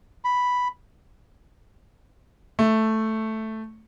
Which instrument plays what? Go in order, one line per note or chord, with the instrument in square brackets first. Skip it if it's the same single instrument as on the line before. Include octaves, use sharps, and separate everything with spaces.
[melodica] B5
[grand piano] A3